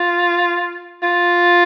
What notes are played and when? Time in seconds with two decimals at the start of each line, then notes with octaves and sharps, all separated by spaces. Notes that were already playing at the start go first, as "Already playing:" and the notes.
Already playing: F4
1.03 F4